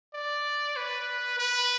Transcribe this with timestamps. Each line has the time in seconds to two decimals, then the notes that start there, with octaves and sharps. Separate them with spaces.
0.14 D5
0.76 B4
1.39 B4